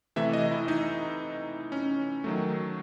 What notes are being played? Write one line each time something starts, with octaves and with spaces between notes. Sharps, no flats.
C3 E3 A3 E5
D#5
E4
D#4
C#4
D#3 F#3 A3